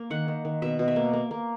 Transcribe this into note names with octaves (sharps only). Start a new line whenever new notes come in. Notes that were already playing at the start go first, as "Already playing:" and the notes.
Already playing: A#3
D#3 F#5
D#3
D#3
B2 E5
B2
E5
A#3
A#3
A#3